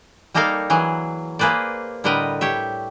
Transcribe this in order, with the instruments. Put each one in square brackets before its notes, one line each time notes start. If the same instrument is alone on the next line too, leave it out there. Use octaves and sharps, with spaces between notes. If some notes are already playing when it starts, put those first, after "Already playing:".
[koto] G3 A#3 D#4 A4 A#4 F5
E3 F#3 G#4
A#3 G#4 B4 C5 D5
A2 D3 G3 A#4 B4 D#5
G4 C#5 E5